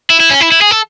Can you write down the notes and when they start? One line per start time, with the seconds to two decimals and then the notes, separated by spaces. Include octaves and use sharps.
0.10 E4
0.20 E4
0.31 C#4
0.41 E4
0.52 E4
0.62 G#4
0.71 A4